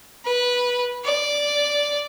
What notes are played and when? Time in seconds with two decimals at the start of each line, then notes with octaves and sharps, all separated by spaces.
0.25 B4
1.04 D5